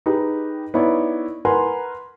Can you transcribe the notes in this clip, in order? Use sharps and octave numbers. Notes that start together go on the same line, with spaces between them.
D#4 G4 G#4 B4
B3 D#4 E4 C#5 D5
A#4 B4 F#5 G#5 A#5 C6